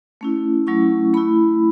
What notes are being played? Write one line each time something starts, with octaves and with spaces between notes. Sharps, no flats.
A3 C#4 E4
F#3 A3 C#4 E4 C#6
A3 E4 B5